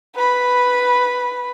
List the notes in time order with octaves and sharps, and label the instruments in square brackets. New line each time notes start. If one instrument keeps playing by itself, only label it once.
[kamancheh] B4 B5